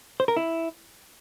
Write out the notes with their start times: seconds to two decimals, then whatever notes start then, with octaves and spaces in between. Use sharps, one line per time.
0.20 C5
0.28 A#4
0.36 E4